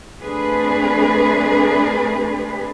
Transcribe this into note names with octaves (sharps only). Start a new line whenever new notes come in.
A3 C4 D4 G#4 B4